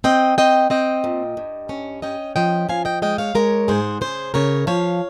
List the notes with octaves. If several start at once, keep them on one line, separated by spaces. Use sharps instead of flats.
C4 D#5 G5
C4 D#5 G5
C4 D#5 G5
A#2
G2
C#4
C#4 D#5 G5
F3 D#5 G5
F3 F5 G#5
D#5 G5
G#3 D#5 G5
C#5 F5
G#3 A#4 C#5
G#2 G#4 C5
C#3 G#4 C5
C#3 A#4 C#5
F3 C#5 F5